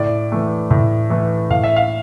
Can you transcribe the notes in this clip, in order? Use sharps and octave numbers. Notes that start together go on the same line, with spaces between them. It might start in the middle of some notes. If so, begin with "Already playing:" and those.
Already playing: A2 D5
E3 A3
A2
E3 A3
A2 F5
E5
F5